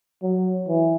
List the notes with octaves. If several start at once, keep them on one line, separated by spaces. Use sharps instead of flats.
F#3
E3